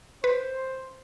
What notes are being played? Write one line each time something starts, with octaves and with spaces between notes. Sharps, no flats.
B4 C5